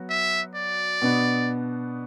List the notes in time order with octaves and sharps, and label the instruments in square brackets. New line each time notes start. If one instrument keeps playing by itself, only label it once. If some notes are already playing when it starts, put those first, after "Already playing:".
Already playing: [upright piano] F#3 B3 F#4
[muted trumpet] E5
D5
[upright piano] B2 B3 D4